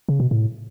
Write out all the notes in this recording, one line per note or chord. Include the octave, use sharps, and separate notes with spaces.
C#3
B2
A2